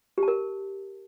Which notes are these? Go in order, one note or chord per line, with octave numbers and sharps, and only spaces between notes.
G4
A5
A#4